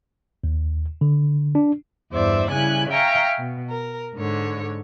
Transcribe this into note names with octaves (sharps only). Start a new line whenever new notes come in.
D#2
D3
D4
E2 G2 C5 D5 E5
C#3 G3 E4 G#5 F#6
E5 F5 G5 G#5 A#5 C#6
B2
A#4
G#2 D3 C#5